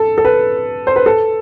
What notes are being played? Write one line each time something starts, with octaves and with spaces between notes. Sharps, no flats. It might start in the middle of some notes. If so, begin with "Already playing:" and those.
Already playing: A4
A4
B4
C5
B4
A4